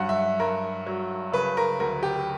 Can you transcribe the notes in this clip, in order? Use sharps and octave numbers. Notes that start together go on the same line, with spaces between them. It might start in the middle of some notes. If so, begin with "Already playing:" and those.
Already playing: G2 F#3 F#5
E5
G2 A#4
F#3
C#3 B4
A#4
D2 A#4
G4